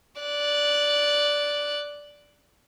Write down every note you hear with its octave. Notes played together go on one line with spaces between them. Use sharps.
D5 F#6